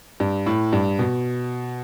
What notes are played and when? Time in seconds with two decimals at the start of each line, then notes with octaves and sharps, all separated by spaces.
0.20 G2
0.46 A2
0.73 G2
0.99 B2